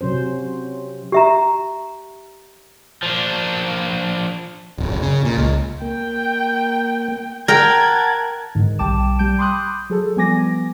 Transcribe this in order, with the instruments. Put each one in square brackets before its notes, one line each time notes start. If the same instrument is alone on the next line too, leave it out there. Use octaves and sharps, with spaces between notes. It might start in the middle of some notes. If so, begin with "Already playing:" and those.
[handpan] C3 F#3 C#4 C5
[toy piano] G4 E5 A#5
[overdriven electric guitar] F3 D4
[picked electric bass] D1
F#1
C#3
A#2
C#2
[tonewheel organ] A#3 [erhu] G5
[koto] A#4 G5 [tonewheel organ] F#5 A5 [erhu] G#6
[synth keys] G#2 D3 D#3
B1 G3 G5 A5 D6 E7
G3 G5 G6 D7
B5 C6 D6 D#6 F#6 G6
F#3 G#4 A4
F3 G3 B3 G#5 D6 A#6